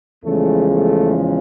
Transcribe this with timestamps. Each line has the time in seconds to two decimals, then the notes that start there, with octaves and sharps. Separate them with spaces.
0.24 E2 C#3 F3 G#3 A3
0.70 A3